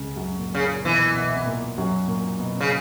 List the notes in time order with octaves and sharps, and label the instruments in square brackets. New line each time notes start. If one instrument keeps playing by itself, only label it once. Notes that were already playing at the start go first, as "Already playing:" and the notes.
Already playing: [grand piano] C#2 C#3
F#2 F#3
A#2 A#3
[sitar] C#3
[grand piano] A#2 A#3
[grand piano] B2 B3 [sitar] E3
[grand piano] B2 B3
B3
A#2 A#3
F#2 F#3
A#2 A#3
B2 B3
[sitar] C#3 [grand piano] B3